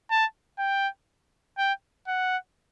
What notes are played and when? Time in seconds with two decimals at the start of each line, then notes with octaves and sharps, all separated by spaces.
0.11 A5
0.59 G5
1.58 G5
2.07 F#5